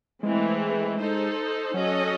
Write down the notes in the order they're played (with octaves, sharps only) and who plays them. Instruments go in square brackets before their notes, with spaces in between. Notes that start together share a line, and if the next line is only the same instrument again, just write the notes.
[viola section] E3 A3 C4 [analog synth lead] G#3
[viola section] D#4 A4 C5
[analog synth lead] F#3 [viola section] C#4 F#4 A4 D#5